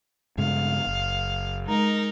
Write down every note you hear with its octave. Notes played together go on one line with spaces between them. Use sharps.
G2 C#3 G#3 F5
F#1
G#3 D#4 A#4